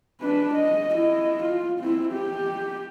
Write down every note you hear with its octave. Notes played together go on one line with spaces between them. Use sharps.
D4 B4
D#5
E4 D#5
F4
C4 E4
G4